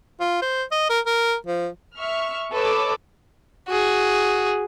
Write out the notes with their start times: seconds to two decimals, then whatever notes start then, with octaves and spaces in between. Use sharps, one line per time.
0.21 F4
0.42 C5
0.72 D#5
0.90 A#4
1.06 A#4
1.47 F3
1.96 E5 C#6 F6
2.52 A4 B4 C#5 D#5 D6 E6
3.68 F#4 G#4